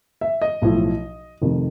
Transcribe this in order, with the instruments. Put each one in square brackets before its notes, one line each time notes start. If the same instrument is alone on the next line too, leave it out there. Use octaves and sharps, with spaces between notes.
[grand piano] E5
D#5
B1 A2 F3
F1 F2 C3 D#3